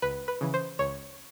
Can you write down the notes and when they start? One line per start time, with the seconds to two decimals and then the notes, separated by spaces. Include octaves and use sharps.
0.02 C#2 B4
0.28 B4
0.41 C#3 E3
0.54 C5
0.79 C#2 C#5